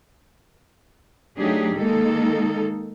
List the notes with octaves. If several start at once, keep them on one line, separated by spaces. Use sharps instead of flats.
F#3 A3 D4 D#4 G4 G#4
D#3 G#3 A#3 D#4 A4